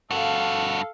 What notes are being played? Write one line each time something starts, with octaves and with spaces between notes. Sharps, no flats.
G2 F#4 A4 F5